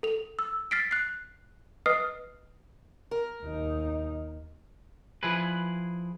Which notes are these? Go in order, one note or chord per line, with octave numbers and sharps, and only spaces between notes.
A4 F7
E6
F6 A6 B6 C7 D7
F#6 C7
B4 D#5 D#6 F6 C7
A#4
D#2 D#4
F3 E4 G#4 B4